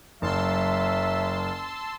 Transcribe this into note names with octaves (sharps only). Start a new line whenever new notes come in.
F#1 F#3 E5 A5 C6 E6